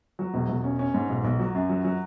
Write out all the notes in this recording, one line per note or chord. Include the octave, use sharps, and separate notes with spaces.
F#3
E1
E1
C#4
C#4
G#2
B1
B1
F#3
F#2
F#3
F#3